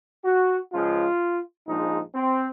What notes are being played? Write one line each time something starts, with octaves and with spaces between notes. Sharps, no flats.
F#4
C#2 C#3 F3 G#3 F4
A#1 G#2 F3 G#3 D#4
C4